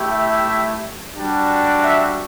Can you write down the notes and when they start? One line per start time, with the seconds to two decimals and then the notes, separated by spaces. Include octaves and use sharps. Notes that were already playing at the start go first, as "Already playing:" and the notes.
Already playing: A3 E4 G4
0.09 E5
1.13 G3 D4 F#4
1.83 E5